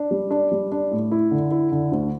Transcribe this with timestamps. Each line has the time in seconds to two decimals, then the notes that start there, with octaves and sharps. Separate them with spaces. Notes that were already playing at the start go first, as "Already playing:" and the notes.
Already playing: D4
0.11 G3
0.31 D4
0.52 G3
0.72 D4
0.91 A2
1.11 E4
1.31 D3
1.51 E4
1.72 D3
1.92 D2